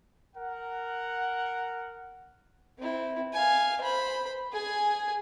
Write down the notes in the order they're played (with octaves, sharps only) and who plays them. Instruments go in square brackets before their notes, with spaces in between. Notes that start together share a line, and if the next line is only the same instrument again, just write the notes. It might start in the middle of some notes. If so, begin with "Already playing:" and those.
[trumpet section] A#4 F#5
[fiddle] C4 E4
F5 G#5
C5 B5
G#4 G#5